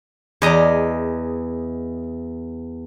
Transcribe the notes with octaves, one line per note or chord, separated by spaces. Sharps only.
E2 G#4 D5 D#5 A#5